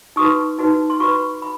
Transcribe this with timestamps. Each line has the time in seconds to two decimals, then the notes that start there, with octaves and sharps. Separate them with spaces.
0.16 D#4 F#4 B4 C#6 D#6
0.59 D#4 F#4 B4
0.90 C6
1.00 F#4 B4 B5 C#6
1.42 B5